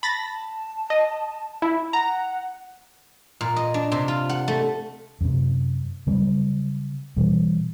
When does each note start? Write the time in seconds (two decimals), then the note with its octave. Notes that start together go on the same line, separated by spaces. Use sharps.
0.03 A5 B5 A6 A#6
0.90 D#5
1.62 E4
1.93 F#5 A#5
3.41 A#2
3.56 D#5
3.74 D4
3.92 C3
4.08 F4
4.29 F#5
4.48 A3
5.21 F#2 C3
6.07 C#3 F#3 G3 C4
7.16 B2 E3 G3